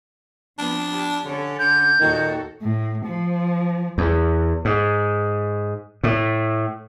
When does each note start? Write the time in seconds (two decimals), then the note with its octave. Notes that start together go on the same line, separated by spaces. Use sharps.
0.58 F3 B3 C4 D4
0.92 G4
1.25 D3 C#4 A4
1.59 D3 G6
2.00 D#2 A#2 D#3 F#4 A4
2.61 A2
3.05 F3
3.98 E2
4.65 G#2
6.04 A2